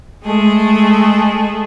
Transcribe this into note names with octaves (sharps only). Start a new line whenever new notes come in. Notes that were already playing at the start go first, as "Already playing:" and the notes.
G#3 A3 G#4 A4